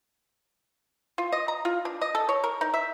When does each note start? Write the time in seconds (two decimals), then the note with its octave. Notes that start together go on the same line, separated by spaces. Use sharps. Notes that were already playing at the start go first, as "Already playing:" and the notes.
1.18 F4
1.32 D#5
1.48 A#5
1.65 F4
1.85 D4
2.01 D#5
2.15 A4
2.29 C#5
2.44 A#4
2.61 D#4
2.74 E5